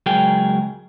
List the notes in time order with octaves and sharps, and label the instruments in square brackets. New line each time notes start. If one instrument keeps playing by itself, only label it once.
[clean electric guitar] C#2 F#3 G#4 A#4 G5